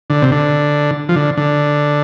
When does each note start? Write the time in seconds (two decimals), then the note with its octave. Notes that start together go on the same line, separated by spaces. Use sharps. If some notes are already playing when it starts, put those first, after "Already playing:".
0.10 D3
0.22 C3
0.32 D3
1.09 F3
1.16 D3
1.37 D3